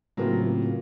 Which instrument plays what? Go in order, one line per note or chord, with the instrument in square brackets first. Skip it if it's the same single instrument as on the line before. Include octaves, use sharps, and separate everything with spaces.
[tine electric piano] A2 C#3 C4 [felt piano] F#3 A#3 F4